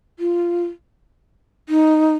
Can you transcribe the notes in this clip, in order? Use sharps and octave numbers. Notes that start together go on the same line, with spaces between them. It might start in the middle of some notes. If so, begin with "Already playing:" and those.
F4
D#4